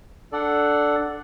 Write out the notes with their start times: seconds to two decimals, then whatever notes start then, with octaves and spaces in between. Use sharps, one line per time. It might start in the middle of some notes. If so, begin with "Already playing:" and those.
0.32 D4 A4 D5 F#5